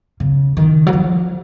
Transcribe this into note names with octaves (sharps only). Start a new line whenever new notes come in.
C#3
D#3
F#3
F3